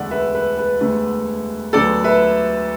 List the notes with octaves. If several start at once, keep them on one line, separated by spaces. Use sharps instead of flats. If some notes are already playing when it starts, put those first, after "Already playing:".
Already playing: E1 D2 D3 A3 D5 F#5
B4 E5
B4
B4
E1 D2 D3 A3
D2 D3 F#3 B3 A4 D5
B4 E5